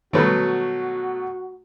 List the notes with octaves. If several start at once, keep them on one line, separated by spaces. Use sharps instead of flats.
B2 D#3 F#3 G3 A3 F#4 B4